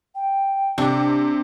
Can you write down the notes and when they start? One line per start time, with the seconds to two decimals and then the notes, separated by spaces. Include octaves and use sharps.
0.15 G5
0.78 C3 D4